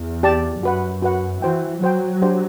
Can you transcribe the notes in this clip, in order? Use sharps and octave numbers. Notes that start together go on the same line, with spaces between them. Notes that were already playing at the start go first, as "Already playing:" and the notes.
Already playing: E2
G4 D5 A5
F#2 F#4 B4 F#5
F#4 B4 F#5
E3 F#4 C5 G5
F#3 F#4 C5 G5
D4 G4 C5 F#5